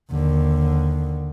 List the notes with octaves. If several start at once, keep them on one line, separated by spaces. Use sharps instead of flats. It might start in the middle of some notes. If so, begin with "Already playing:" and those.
D#2 D3